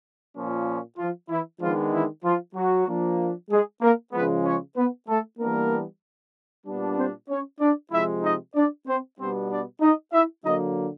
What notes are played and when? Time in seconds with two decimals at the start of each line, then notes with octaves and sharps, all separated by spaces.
0.34 A#2 F3 A#3 C#4
0.97 F3 F4
1.29 E3 E4
1.60 D#3 F3 G#3 B3 D4 F4
1.92 E3 E4
2.23 F3 F4
2.55 F#3 F#4
2.87 F3 A#3 D4
3.50 G#3 G#4
3.81 A#3 A#4
4.13 C#3 F3 G#3 B3 B4
4.44 C#4 C#5
4.76 B3 B4
5.08 A3 A4
5.39 E3 G3 A#3 B3 D4 A#4
6.66 A#2 G3 B3 D4
6.97 C4 C5
7.29 C#4 C#5
7.60 D4 D5
7.91 C3 F3 G#3 E4 E5
8.23 D#4 D#5
8.55 D4 D5
8.86 C4 C5
9.18 B2 G3 B3 C4 D4 C5
9.50 D4 D5
9.81 D#4 D#5
10.12 E4 E5
10.44 D3 F#3 A#3 D#4 D#5